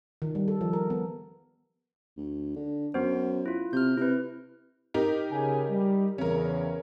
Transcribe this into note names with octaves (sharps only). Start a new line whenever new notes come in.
D#3
G3
A4
F3
A#4
B3
D2
D3
F#2 B3 C5
E4 F4
C3 F6 G6
C3 E4 B4
D#4 G4 A#4
C#3 G#5
G3
E2 C#3 C#4 A#4